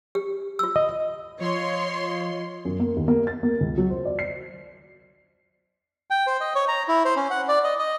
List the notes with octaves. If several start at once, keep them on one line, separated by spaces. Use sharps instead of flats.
G4
F4 E6
D#5
F3 F4 C#5 D#5 C6
F#2
A#3
D#2
A#3
A6
A#3
C#2
F#3
C5
D5
C7
G5
C5
D#5
C#5
A#5
E4
C5
C#4
F#5
D5
D#5
D#5